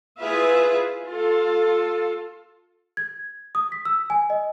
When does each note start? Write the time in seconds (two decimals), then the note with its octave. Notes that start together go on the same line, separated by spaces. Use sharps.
0.20 E4 F4 G#4 B4 E5 F5
1.06 F4 A4
2.97 G#6
3.55 D#6
3.72 B6
3.85 E6
4.10 G#5
4.30 D#5